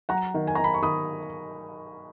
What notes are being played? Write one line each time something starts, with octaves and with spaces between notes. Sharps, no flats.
F#3 F#5 A#5
D#3
G#5
D#3 A#5
B5
C#6
D#3 B5 D#6